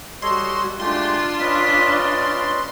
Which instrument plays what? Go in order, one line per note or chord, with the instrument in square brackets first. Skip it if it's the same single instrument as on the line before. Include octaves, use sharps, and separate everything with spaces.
[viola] G3 F#4 [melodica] A4 C#5 D#5 [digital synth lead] C6
[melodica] G#3 A3 G4 [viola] D4 F4 [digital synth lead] C6
[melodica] C#4 B4 D#5 [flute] B6
[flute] D5